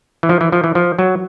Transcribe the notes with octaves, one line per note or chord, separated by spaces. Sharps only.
E3
F3
E3
F3
E3
F3
F#3